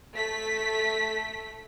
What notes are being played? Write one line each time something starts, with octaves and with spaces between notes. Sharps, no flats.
A3 B6